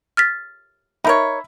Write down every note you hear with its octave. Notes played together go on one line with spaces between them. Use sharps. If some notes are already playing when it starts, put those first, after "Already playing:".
F6 A6 B6
D#4 A#4 C#5 E5 B5